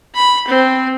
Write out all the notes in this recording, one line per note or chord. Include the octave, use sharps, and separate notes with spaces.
B5
C4